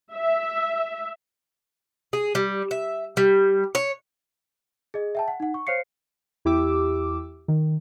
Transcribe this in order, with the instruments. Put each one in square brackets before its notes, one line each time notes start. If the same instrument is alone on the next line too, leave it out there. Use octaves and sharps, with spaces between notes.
[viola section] E5
[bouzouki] G#4
G3
E5
G3
C#5
[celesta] G#4 D#5
E5 G5 A5
F#5
D#4 F#5
C#6
C5 C#5 F5 C7 C#7
[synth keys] E2 E4 G4 D6 E6
D#3